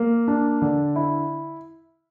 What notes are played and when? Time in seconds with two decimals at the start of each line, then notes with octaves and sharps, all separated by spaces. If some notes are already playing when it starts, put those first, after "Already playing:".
Already playing: A#3
0.28 D4
0.62 D3
0.96 E4